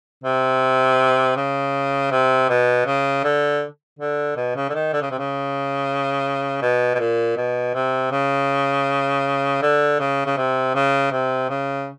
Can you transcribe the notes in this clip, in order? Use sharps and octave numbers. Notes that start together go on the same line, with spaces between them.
C3
C#3
C3
B2
C#3
D3
D3
B2
C#3
D3
D#3
D3
C#3
C3
C#3
B2
B2
A#2
B2
C3
C#3
D3
C#3
C#3
C3
C#3
C3
C#3